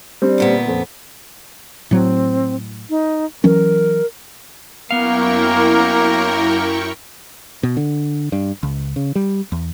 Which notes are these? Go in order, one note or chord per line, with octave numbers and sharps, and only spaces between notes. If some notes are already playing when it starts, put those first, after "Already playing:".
G3 C4 D4
D2 A#2 B3
F2
A2 F#3 C4
D#4
E3 F#3 C#4 A#4
F#2 A#3 B3 E4 A#4 F5 G5 C#6
B2
D3
G2
C#2
C#3
G3
E2